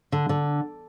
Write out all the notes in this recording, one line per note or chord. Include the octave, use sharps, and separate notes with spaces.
D3
D3